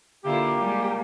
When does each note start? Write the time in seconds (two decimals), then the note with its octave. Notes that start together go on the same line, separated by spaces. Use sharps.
0.25 D3 A#3 E4 F4 G4
0.57 G3 G#3